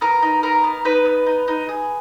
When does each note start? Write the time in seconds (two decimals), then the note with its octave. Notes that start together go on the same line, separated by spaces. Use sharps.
0.01 B3 A#4
0.22 D#4
0.43 B3 A#4
0.64 B3
0.85 D#4 B4
1.05 B3
1.26 D#4
1.48 D#4
1.69 G#4